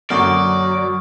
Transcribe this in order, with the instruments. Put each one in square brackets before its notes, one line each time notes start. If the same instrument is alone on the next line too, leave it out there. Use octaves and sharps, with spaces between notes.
[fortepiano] F#2 D3 A#3 [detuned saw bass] F#3 [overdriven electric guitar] D5 [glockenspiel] C#6 D#6 F6